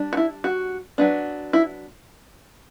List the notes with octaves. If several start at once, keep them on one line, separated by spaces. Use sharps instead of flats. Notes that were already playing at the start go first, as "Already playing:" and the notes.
Already playing: G3 D4
F#4
E4
F#4
F#3 B3 D4
E4